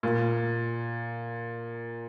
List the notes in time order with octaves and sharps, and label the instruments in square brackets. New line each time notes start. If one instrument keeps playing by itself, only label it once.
[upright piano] A#2